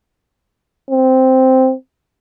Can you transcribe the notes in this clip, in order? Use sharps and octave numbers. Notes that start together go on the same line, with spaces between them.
C4